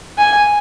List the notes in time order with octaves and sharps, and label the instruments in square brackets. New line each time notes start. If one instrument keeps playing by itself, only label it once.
[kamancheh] G#5